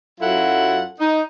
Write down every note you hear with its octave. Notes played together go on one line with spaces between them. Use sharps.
F#2 F#3 E4 F4 A4 F#5
D#4